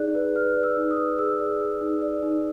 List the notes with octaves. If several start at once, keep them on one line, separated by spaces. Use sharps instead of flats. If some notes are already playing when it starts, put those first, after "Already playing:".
Already playing: D#4 G#4 D5 F#6
B4
B4 F6
D5
E6
D#4
D#6
B4
G#4 E6
D5
G#4
D#4
D5
D#4